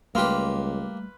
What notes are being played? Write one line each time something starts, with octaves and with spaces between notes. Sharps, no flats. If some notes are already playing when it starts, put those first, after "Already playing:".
C#2 G3 A3 A#3 G4 B4 C6 F6